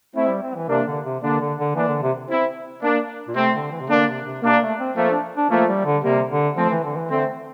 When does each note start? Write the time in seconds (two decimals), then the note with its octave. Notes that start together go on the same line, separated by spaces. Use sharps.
0.15 A3 C4 E4
0.28 G3
0.42 C4
0.55 E3
0.69 C3 A#3 D4
0.87 D3
1.05 C3
1.22 D3 A#3 D4
1.40 D3
1.58 D3
1.75 E3 A#3 D4
1.88 D3
2.02 C3
2.29 C4 E4
2.83 A#3 D4
3.28 A#2
3.36 C3 A3 C4
3.54 D3
3.71 E3
3.81 C3
3.89 D3 A#3 D4
4.07 C3
4.25 C3
4.42 C3 A#3 D4
4.61 A3
4.79 C4
4.96 F3 A3 A#3
5.10 D4
5.37 D4
5.50 F3 A3 A#3
5.68 G3
5.85 D3
6.03 C3 G3 A#3
6.30 D3
6.57 F3 A3 C4
6.70 E3
6.84 D3
6.97 E3
7.10 D3 A3 C4